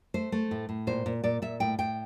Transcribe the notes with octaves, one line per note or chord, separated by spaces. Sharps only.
A3 C5
A3
A2
A2
A#2 C5
A#2
A#2 D5
A#2 E5
A2 G5
A2 G5